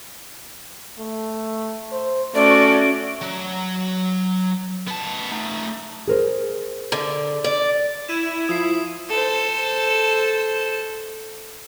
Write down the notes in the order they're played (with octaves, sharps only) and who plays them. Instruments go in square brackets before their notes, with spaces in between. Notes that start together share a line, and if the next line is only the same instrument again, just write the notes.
[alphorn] A3
C5
[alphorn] A3 [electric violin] C#4 F#4 [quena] D5
[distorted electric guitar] F#3
B3 A5
A3 D#4
[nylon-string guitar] G#4 A#4 C5
[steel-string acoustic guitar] D3
D5
[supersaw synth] E4 [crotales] G#6 D#7 E7
[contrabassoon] F3 [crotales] D#6 C7
[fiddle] A4 C5